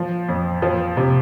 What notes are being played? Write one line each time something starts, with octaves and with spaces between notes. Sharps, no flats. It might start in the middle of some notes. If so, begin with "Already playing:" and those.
Already playing: F3
F2
F3
C3